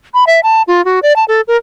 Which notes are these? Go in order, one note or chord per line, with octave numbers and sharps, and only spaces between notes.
B5
E5
A5
F4
F#4
D5
A5
A4
A#4